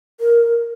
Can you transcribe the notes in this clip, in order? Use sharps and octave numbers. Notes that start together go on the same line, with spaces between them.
A#4